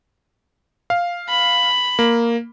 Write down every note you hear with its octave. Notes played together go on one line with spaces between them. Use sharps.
F5
B5
A#3